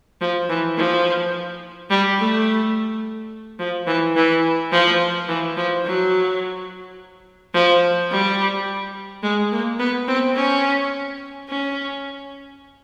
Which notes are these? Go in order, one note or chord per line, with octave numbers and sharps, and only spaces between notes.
F3
E3
F3
G3
A3
F3
E3
E3
F3
E3
F3
F#3
F3
G3
G#3
A#3
B3
C4
C#4
C#4